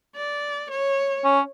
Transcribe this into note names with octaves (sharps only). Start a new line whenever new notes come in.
D5
C#5
C#4